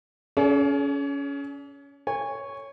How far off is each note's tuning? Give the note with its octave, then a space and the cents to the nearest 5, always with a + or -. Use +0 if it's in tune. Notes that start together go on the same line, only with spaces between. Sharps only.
C#4 +20 G#4 +45 D5 -40
C#5 +0 G#5 -35